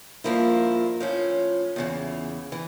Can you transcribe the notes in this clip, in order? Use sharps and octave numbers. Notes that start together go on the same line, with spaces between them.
G2 F3 A#3 E4
A2 F3 C#4
E2 C#3 E3
E3